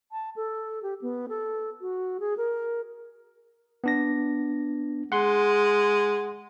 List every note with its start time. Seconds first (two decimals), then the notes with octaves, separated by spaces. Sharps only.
0.12 A5
0.36 A4
0.83 G4
1.02 B3
1.29 A4
1.81 F#4
2.20 G#4
2.37 A#4
3.84 B3 D4 A#6
5.12 G#3 F#5 C6